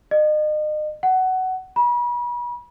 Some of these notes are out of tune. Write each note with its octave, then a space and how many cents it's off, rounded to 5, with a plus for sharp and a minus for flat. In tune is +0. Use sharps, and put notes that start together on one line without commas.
D#5 -35
F#5 +15
B5 -40